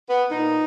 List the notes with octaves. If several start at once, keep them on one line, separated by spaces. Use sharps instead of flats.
B3
A#2 A#3 B3 D#4